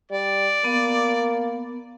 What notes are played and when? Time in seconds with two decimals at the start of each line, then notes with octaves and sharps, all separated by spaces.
0.11 G3 D5
0.64 A#3 B3